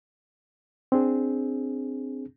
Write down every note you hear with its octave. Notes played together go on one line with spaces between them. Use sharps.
C4 D4 G#4